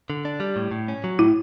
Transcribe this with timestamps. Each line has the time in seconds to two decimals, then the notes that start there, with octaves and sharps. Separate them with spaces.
0.10 D3
0.25 D4
0.40 G3
0.56 A2
0.71 A2
0.88 C#4
1.04 F#3
1.19 A2 E4